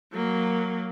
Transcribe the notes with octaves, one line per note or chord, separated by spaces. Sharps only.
F#3 A#3